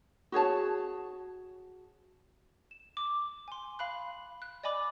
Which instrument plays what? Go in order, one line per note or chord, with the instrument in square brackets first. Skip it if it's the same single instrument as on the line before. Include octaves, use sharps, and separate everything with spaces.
[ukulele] F#4 G#4 C#5 A5
[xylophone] E7
D6
G#5 C6
F5 B5 F#6
F#6
D5 D#5 G#5 B5 D6